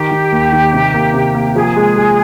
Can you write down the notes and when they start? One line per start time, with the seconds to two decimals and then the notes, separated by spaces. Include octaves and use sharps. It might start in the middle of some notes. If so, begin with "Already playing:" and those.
Already playing: D#3 G4
0.11 D#3
0.32 D#2
0.52 D#3
0.73 C3
0.94 A#3
1.14 C3
1.34 A#3
1.55 F3 G#4
1.76 G#3
1.96 G#3